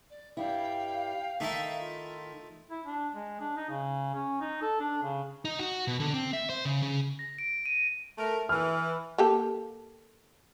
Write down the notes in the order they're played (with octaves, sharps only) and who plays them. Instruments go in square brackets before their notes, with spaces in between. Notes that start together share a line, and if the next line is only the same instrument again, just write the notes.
[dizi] D5
[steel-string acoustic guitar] G2 G3 E4 [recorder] F5 [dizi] G5
[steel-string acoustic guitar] D#3 [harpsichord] A3 D#4 E4 [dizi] E5
[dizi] F4
[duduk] E4
D4
G#3
D4
D#4
C#3
C#4
D#4
A4
D4
C#3
[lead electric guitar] D#4
F#4
B2
D3
C4
E5
C5
C#3
C#3
[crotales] A#6
D7
D#7
[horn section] A3 A#4
[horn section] E3 [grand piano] F6
[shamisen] A#3 G4 A4